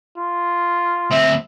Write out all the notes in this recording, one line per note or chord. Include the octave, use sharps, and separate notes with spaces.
F4
D2 C4 E5